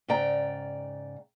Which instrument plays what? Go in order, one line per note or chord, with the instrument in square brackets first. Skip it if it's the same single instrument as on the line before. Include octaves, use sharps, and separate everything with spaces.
[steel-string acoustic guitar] G#2 C#3 D5 G5 A#5